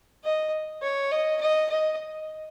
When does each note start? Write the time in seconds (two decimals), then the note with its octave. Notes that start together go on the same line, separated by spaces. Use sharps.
0.24 D#5
0.82 C#5
1.12 D#5
1.41 D#5
1.70 D#5